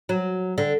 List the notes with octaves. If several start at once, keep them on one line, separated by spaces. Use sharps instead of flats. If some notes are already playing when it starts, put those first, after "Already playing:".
F#3
D3